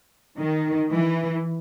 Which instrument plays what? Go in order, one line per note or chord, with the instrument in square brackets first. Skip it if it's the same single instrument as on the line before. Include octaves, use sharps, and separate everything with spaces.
[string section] D#3
E3